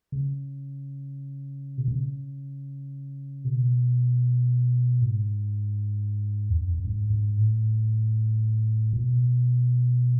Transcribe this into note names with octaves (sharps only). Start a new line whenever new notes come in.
C#3
B2
C#3
B2
G#2
E2
F#2
F#2
G#2
G#2
A2
B2